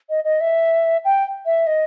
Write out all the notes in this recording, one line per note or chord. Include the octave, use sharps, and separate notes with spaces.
D#5
D#5
E5
G5
E5
D#5